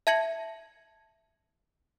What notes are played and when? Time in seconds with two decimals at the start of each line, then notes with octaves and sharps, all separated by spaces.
0.07 E5 A5 G#6 A#6 C#7 F#7